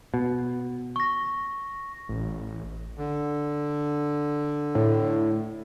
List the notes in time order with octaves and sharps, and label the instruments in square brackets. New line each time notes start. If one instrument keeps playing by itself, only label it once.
[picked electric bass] B2
[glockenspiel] C#6 A#6
[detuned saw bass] A1
[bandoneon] D3
[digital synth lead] A2